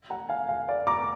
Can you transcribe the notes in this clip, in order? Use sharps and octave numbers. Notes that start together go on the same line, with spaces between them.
F#5 A#5
F5 G#5
F5 G#5
D5 F5
A#5 D6